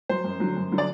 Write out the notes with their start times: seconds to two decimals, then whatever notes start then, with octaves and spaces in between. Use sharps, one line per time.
0.09 F#3 C5
0.24 F#2
0.40 D3 F#3
0.57 F#2
0.72 D3 F#3
0.78 D5